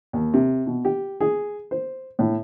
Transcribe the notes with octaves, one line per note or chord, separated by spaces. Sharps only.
D#2
C3
B2
G4
G#4
C5
A2